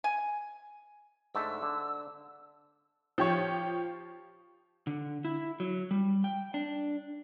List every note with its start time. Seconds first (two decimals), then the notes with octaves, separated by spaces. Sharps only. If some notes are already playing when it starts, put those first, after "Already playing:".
0.04 G#5
1.35 G#2 D3 A3 E6
1.62 D3
3.18 F3 G4 C#5
4.87 D3
5.25 E4
5.60 F#3
5.91 G3
6.24 G5
6.54 D4